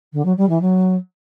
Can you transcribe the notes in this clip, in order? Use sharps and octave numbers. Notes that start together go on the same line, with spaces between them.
D3
F#3
G3
E3
F#3